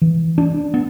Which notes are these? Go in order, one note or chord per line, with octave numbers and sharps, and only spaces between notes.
E3
D4
B3